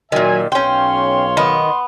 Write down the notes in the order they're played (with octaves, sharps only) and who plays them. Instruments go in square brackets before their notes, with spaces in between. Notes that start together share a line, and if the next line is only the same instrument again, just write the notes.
[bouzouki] A#2 D#3 [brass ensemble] F#3 E5 G#5
[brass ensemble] B1 C#5 F5 [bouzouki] C#4 G5 [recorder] C6
[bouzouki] D#3 [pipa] B3